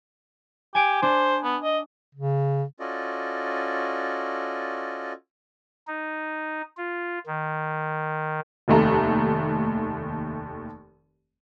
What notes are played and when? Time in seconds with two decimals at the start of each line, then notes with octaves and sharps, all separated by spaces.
0.75 G4 G#5 D7
1.02 D4 C5
1.44 B3
1.63 D#5
2.15 C#3
2.80 C#4 F4 F#4 A4 D5 D#5
5.87 D#4
6.77 F4
7.26 D#3
8.68 F1 D#2 A3 A#5